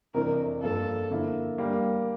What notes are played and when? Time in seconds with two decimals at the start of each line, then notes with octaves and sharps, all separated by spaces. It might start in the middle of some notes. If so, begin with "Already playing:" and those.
0.14 F2 C3 E3 A3 D4 A#4
0.62 G2 F3 A#3 A4
1.10 D3 F3 A#3 E4
1.58 G3 A#3 D4